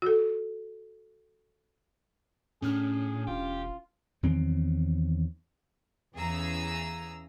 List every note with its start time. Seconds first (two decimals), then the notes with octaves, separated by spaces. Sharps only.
0.02 F#4 A4
2.62 A2 C#4 D4 G#4 F6
3.27 E1 F4 G4
4.23 E2 D#3 F#3 C4
6.15 E2 C#3 E3 G#4 A#5 E6